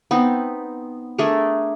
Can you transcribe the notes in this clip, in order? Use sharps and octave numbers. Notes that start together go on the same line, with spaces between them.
B3 C4 D#4
A3 D4 G#4 A#4